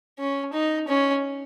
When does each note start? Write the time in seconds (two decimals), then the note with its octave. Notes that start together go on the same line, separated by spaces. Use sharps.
0.19 C#4
0.54 D#4
0.88 C#4